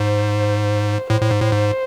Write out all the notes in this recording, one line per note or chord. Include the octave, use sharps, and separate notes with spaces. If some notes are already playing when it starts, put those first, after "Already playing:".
Already playing: G#2 C5
A2 C5
A2
G#2
A2
G#2